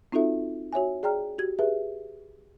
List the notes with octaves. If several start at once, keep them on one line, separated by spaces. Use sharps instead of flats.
C4 D#4 F4 F#4 A4 E5
F#4 C#5 E5 G#5
G#4 D5 G5 A#5 F6
F#4 G4 G#6
G4 G#4 B4 E5